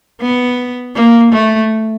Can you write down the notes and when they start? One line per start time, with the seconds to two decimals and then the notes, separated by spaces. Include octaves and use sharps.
0.21 B3
0.95 A#3
1.32 A3